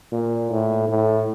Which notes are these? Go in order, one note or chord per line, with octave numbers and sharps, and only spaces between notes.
A#2
A2
A2